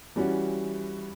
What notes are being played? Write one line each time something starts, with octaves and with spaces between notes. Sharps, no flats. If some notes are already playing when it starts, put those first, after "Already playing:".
E3 G3 C#4 F#4